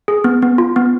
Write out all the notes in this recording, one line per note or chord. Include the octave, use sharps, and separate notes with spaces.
G#4
B3
B3
F4
B3